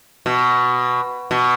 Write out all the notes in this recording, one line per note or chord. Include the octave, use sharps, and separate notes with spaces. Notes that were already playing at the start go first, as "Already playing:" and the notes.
B2
B2